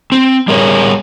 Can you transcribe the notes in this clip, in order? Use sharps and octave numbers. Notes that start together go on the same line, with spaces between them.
C4
G3 G#4 A#4 C#5